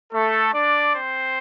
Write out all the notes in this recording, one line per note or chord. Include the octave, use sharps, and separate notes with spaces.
A3 A4
D4 D5
C4 C5